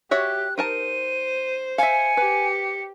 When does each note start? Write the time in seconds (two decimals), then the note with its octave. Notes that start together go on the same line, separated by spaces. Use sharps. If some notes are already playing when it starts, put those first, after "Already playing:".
0.11 F#4 G4 C#5 E5 F#6
0.58 D#4 A#4 C5 A5 D#7
1.78 E5 F5 G#5 C#7
2.17 G4 B4